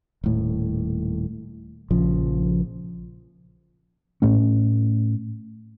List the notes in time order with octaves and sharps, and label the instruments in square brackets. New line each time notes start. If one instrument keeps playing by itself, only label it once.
[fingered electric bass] D#1 A2
A#1 C#3 F3
[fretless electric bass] A2 A3 C#4